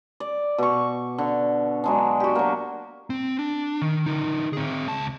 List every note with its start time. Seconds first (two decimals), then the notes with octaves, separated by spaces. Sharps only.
0.20 D5
0.58 B2 C#6
1.18 D3
1.84 F#3 G#3 D4
2.20 F#4 G4
2.35 F#3 A#3
3.10 C4
3.39 D4
3.81 D#3
4.06 D3 D#4
4.53 C4 G#4
4.87 C#2 A5